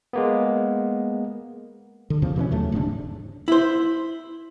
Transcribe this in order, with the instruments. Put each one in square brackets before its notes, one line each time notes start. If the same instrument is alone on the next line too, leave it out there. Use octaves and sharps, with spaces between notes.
[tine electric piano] G#3 A#3 B3
[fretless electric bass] D3
E2 C#3 F3
B2 E3 A#3 C#4
D#2 C#3 F#3 A3
D1 G#2 C3 D4
[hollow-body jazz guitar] E4 C5